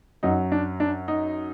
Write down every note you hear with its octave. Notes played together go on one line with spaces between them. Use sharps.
F#2 F#3 D#4
D4
D4
D#4